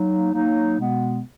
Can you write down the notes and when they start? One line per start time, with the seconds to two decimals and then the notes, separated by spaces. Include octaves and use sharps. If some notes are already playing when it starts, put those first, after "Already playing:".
Already playing: F#3 A#3 D#4
0.32 F#3 A#3 D#4
0.77 B2 G#3 B3